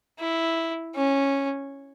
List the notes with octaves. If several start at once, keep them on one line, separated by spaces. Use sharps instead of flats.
E4
C#4